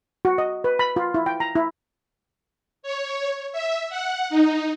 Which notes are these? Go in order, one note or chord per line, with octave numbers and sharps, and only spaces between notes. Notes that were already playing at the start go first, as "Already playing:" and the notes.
F#4
D#5
B4
B5
F4
E4
G5
A#5
E4
C#5
E5
F#5
D#4